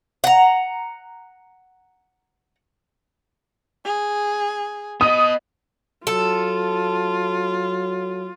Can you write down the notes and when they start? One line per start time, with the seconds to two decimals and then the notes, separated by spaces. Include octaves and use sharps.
0.24 F#5 A#5
3.85 G#4
5.01 B3 D#5 D#6
6.07 F#3 F4 A4